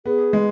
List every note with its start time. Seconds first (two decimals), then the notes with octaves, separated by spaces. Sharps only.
0.06 B3 G#4
0.33 G#3